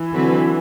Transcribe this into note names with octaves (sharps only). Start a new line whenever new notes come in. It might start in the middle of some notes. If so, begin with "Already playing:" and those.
Already playing: E3
D3 F#3 C4 F#4 B4